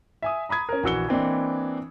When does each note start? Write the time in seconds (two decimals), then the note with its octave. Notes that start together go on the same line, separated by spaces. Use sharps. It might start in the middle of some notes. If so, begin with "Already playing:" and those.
0.22 E5 G#5 D#6
0.49 A#5 B5 D#6 G#6
0.69 C#4 A#4
0.83 A#1 E3 F#4 E6 C#7 G7
1.08 E3 A#3 C4 D4 E4 D#5